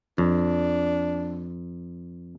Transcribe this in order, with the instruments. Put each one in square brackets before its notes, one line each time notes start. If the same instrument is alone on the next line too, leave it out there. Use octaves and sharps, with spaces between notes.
[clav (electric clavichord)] F2 [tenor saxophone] D4